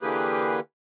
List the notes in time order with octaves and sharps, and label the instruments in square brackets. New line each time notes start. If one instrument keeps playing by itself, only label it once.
[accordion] D3 E3 A#3 G4 G#4 B4